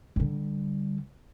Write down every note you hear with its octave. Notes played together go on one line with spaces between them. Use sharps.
D3 G3